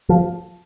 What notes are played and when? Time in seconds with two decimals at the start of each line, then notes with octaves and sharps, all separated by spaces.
0.09 F3